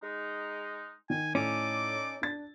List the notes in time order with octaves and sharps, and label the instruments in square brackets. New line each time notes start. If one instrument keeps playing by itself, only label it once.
[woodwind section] G#3 D#4
[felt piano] D#3 [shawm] G#5
[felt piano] A2 [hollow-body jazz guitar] C#4 [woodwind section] D#4 A4 D5 [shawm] D6
[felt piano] D4 A6